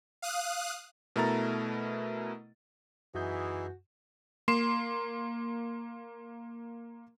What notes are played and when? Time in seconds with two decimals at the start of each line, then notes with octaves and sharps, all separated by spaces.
0.22 F5 D#6 F#6
1.16 B2 A3 E4 A#4 A#5 A6
3.15 F#2 E3 D#4 F#4 G#4 E5 G#5 G6
4.48 A#3 C6 C7 E7